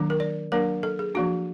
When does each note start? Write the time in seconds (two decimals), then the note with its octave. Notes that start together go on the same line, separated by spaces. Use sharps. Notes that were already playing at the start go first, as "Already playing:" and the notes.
Already playing: D#3 F#3 A#3 D4
0.10 A#4
0.20 D5
0.52 F#3 A#3 D4 A#4
0.83 A4
0.99 G#4
1.15 F3 A#3 D4 F#4